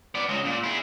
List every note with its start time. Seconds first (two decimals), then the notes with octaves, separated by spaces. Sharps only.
0.15 B3 D5
0.29 C#3 G#3
0.45 A#2
0.64 E4 G#4